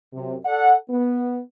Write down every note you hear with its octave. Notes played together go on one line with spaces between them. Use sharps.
F#2 C3
A4 D5 F#5
B3